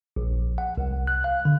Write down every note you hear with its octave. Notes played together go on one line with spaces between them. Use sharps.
A#1
F#5
C2
F#6
F5
D3